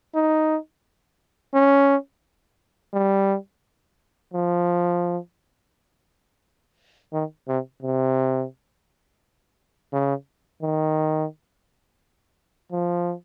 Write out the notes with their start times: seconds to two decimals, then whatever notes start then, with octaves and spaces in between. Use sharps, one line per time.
0.15 D#4
1.54 C#4
2.94 G3
4.33 F3
7.13 D#3
7.48 C3
7.82 C3
9.93 C#3
10.62 D#3
12.72 F3